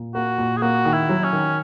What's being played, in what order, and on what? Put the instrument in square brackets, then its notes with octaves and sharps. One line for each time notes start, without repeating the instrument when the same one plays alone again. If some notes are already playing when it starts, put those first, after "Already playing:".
Already playing: [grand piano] A#2
[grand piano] A#3 [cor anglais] F#4
[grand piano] A#2
[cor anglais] G#4
[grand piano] A#3 [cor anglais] F#4
[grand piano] D#3
[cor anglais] E4
[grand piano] F#3
[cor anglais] C#4
[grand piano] D#3